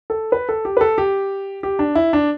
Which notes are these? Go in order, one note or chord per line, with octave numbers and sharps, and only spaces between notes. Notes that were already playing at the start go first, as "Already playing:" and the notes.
A4
B4
A4
G4
B4
A4
G4
G4
D4
E4
D4